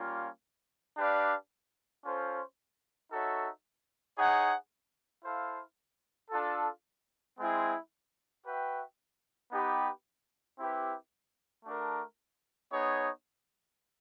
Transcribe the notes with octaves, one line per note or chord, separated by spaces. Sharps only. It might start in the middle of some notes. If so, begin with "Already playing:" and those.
Already playing: G3 A#3 C#4 F4
D4 G4 B4 D5 F5
C#4 F4 A4 C5
D#4 F#4 A4 C#5 E5
D#4 G#4 C#5 F#5
E4 A4 C5 F5
D4 F4 A4
G#3 C4 E4 G#4
F#4 B4 E5 G5
B3 D#4 G4 B4
C4 E4 G4 B4
A3 D4 F#4 A#4
B3 D#4 G#4 C#5